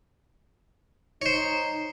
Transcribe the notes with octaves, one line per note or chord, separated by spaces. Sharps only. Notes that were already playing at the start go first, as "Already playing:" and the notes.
D#4 C5 C#5